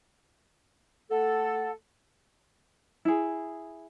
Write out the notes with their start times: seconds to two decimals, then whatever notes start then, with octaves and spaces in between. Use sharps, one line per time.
1.10 A3 A4 F#5
3.05 E4 G#4